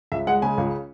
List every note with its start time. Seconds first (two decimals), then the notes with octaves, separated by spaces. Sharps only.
0.12 C#2 E5
0.27 G#3 F#5
0.42 C#3 G#5
0.58 C#2